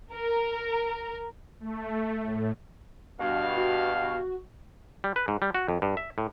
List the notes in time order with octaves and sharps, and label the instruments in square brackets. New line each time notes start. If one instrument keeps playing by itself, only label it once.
[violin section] A#4
[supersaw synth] A3
A2
[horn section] G2 B2 F5 [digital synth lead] F#4
[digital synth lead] F#4
[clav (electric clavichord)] G3
B4
G#2
G3
F#4
F2
G2
E5
A2